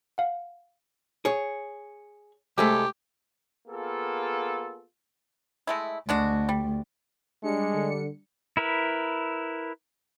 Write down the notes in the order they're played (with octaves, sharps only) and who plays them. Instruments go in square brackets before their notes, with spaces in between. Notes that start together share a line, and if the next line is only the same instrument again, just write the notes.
[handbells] F5 F#5
[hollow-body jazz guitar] G#4 C#5
[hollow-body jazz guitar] C2 G#3 A3 [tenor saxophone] G4
[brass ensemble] A#3 B3 F4 G#4 A4
[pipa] G#3 A3 E4
[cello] D2 [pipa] G#3 D4 F#4
[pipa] G3
[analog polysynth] G3 D4 C#7 [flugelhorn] G#3
[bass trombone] D3
[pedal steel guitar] E4 A#4 B4